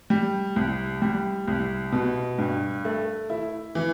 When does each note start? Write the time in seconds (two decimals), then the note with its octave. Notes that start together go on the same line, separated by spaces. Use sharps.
0.10 G3
0.56 C2
1.02 G3
1.47 C2
1.92 B2
2.38 G2
2.85 A3
3.30 E4
3.75 E3